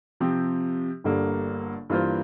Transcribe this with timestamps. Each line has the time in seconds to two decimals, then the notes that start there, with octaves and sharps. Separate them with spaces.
0.20 C3 F3 C4 G4
1.04 G1 G2 D3 G3 A#3
1.90 G2 E3 A#3 F4 C5